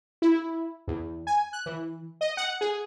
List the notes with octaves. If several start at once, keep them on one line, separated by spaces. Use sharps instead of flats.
E4
E2
G#5
F#6
E3
D#5
F#5
G#4